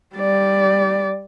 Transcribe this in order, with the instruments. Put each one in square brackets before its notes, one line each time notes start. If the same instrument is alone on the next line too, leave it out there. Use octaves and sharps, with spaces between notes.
[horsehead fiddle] G3 D5